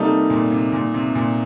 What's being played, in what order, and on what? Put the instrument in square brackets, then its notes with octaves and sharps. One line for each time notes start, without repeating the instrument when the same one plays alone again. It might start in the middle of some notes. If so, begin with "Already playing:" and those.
Already playing: [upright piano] C3 [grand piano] G3 A#3 D#4 A4
[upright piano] A#2
C3
A#2
C3
A#2